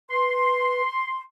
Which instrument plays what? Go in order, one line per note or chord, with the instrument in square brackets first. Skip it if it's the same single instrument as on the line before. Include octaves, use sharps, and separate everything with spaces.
[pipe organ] B4 [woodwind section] C6